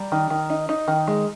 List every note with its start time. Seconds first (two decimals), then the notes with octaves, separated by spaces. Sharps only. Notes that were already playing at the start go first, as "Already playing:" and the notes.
Already playing: G3 A#5
0.12 D#3
0.30 D#3
0.50 D#4
0.69 D#4
0.88 D#3
1.08 G#3